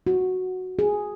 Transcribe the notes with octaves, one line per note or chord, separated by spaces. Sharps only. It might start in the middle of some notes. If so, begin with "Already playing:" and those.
F#4
G#4